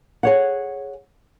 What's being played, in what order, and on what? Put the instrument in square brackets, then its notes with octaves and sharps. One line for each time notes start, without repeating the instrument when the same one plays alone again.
[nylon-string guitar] G#4 C#5 F#5